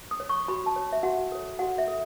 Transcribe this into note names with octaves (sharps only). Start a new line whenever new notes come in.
D#6
C#5
C#6
F#4 B5
A5
C#5
E5
F#4 F#5
A4 C#5
F#4 F#5
E5
A4